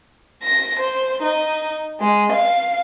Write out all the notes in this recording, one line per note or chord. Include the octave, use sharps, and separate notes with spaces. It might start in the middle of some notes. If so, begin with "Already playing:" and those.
A#6
C5
D#4
G#3
F5